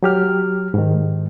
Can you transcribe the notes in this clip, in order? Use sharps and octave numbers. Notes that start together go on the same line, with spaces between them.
F#3 G4 F6
G#2 D#3